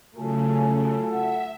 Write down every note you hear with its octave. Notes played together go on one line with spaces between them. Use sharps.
C#3 F#3 A3 F4 F#4 A4 G#5
E5 F#5